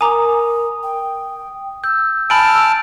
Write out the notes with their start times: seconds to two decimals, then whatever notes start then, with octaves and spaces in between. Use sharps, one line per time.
0.01 A#4 G#5 A#5 D6 D#6
0.83 G5
1.84 E6 G6
2.30 G#5 A5 B5 E6 F6 D7